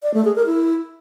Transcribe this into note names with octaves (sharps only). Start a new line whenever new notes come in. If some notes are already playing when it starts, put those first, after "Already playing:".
D5
A3
G#4
A#4
E4